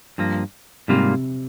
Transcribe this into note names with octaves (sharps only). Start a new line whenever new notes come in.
G2 F3 A#3
G#2 C3 G3 A#3 F4